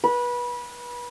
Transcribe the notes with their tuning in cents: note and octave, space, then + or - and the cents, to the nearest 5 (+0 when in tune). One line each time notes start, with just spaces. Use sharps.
B4 -25